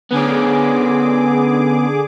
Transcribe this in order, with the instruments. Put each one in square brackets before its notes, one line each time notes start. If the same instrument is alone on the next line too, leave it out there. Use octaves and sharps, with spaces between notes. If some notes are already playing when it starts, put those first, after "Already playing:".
[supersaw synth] D3 G#4 D6 [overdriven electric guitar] B3 C#4